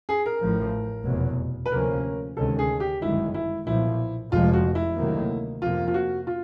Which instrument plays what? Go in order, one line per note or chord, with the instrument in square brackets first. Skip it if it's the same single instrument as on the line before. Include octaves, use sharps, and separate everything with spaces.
[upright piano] G#4
A#4
[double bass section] A1 A2 F3
F1 E2 B2 F#3
[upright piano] B4
[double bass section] D2 C3 F3 A#3 C#4 [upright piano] A#4
[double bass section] D2 C3 D#3 G#3 C#4 [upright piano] A4
[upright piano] G#4
G4
[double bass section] G1 F#2 D#3 G#3 [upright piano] E4
[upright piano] E4
[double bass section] B1 A#2 F3 [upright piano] E4
[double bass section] F1 F2 C3 F3 G#3 [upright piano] F4
[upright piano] F#4
E4
[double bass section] D2 C3 D#3 F#3 A#3
[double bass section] F2 C3 F3 A#3 [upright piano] F4
[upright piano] F4
F#4
F4